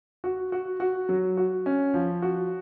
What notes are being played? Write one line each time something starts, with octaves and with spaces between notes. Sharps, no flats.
F#4
F#4
F#4
F#3
F#4
C#4
F3
F#4